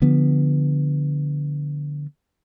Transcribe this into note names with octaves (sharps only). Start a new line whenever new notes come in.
D3 F3 B3